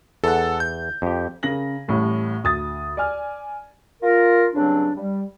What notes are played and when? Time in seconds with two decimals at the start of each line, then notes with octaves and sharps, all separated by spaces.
0.24 E2 A4 F#5
0.60 G6
1.02 F2 G4
1.43 C#3 A#4 A#6 F#7
1.88 A1 A2 G3
2.44 D2 D#6 A6
2.97 D5 G#5 F6
4.02 F4 A#4
4.54 G2 C#3 F#3 C4 D4
4.96 G3